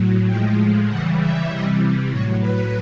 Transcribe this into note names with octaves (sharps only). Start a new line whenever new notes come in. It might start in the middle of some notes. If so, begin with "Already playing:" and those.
Already playing: A2 F#3
A2 F3 G#3 G5
C#3 E3 G3 F#5
E5
C3 E3 G3 D#5
A2 F#3 C#5
B4